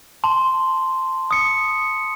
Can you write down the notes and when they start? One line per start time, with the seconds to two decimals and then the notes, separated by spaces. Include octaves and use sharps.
0.24 A5 C6
1.31 D#6 C#7